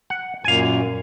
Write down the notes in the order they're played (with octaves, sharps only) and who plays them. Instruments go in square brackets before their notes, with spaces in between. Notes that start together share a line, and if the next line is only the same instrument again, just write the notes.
[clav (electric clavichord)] F#5
[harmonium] F#2 A#2 [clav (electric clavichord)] F5 G#5